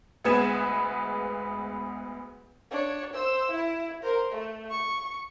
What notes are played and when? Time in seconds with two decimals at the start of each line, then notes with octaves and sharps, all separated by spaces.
0.25 D2 G#3 B3 B4 G#6 E7
2.71 D4 C#5
3.13 C5 E6
3.51 E4
4.03 A#4 C5
4.32 A3
4.70 C#6